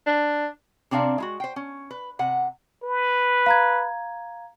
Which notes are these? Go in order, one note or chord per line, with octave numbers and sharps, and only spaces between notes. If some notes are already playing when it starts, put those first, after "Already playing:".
D4
C3 C4 D4 D5 F5 A#5
G#3 E4 F#4
C5 G5
C#4
B4
C3 F#5
B4
F5 A#5 G#6